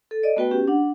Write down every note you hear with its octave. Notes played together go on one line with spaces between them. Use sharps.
A4
D5 D#5
A3 B3 F#4 B4 G5
C#4 G4
D4 F#5